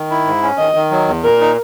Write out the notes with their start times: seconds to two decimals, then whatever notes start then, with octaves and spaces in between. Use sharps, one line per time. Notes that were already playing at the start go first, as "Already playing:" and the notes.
Already playing: D#3
0.10 E4
0.26 G#2
0.43 C#4
0.59 D#3 D#5
0.75 D#3
0.91 F#3
1.08 E2
1.24 A#2 A#4
1.41 D#4